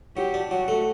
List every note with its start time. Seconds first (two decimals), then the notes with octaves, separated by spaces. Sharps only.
0.17 F#3 G4
0.34 D4
0.51 F#3 F#4
0.68 A3